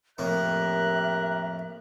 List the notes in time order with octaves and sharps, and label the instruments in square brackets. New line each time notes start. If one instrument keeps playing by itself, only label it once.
[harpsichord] F2 A2 A#3 [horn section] G4 A#4 [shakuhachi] E5 [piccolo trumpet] F#6